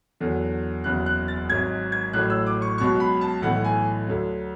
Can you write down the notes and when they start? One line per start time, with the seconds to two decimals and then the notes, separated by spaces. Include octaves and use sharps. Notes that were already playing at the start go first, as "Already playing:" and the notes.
0.20 E2 D3 F#3
0.84 F#1 E2 C#3 F#3 F#6
1.06 F#6
1.28 A6
1.49 G#1 G#2 F#3 G#6
1.92 G#6
2.13 A1 A2 F#3 F#6
2.30 E6
2.46 D6
2.62 C#6
2.78 C#2 B2 F#3 C#6
3.00 B5
3.21 A5
3.42 B1 A2 E3 F#5
3.64 G#5
4.07 D2 D3 F#3